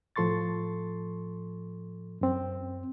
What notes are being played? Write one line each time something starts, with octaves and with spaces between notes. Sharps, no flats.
A2 F3 A4 C6 C#6 A6
F#2 C4